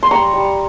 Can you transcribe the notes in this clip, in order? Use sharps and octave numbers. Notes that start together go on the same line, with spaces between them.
C6
G3 A#5 C#6
G3